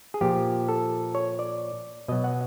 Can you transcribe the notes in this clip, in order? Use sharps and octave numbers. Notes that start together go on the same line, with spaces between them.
G#4
A#2 F3 G4
A4
C#5
D5
B2 F#3 D#5
F#5